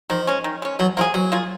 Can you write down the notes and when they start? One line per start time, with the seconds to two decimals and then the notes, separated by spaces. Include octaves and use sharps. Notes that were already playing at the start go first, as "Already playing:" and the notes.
0.10 D#3 F3
0.27 G#3 C#4
0.44 D#3
0.62 G#3 C#4
0.79 B2 F#3
0.97 F3 A#3 F4 G#4
1.14 B2 F#3
1.32 A#3 F4 G#4